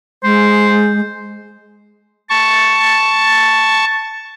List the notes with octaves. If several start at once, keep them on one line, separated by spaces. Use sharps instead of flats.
G#3 C5
A5 C#6